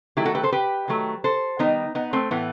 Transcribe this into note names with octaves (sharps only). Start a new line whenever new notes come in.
D#3 F#3 A3 E4 G4
F#4 A4
G4 B4
A4 C5
G4 B4
D#3 F#3 A3
A4 C5
D#3 G3 B3 D#4
B3 D#4
A3 C4
A2 E3 A3 B3